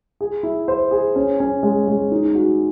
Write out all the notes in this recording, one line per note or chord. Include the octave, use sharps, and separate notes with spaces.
G#4
E4
C5
G#4
C#4
C#4
G#3
G#3
D#4
F#4